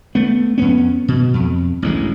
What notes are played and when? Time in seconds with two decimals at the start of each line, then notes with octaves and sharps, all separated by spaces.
0.15 A3 B3
0.58 F2 B3 C#4
1.08 B2
1.34 F2
1.82 A1 D2 G3 G#3